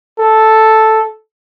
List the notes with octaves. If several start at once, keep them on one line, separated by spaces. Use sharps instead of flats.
A4